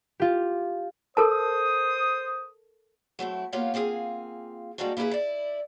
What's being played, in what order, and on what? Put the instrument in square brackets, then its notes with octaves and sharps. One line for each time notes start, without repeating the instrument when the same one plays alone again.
[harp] F4 G4
[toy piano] A4 A#4 A5 [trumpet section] C5 D#6
[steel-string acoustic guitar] F#3 A3 C4 E4
A#3 B3 F4 G4 C#5 F5
A#3 C4 F4 G#4 G#5
G3 G#3 A#3 C4 D4 F#4
A#3 E4 G4 G#4 B4
E4 D5